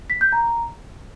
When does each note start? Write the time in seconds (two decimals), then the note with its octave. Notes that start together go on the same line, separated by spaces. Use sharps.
0.10 B6
0.21 G6
0.32 A#5